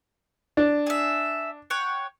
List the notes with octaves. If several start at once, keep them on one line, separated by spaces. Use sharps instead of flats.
D4
G#4 E5
C#5 F#5 G5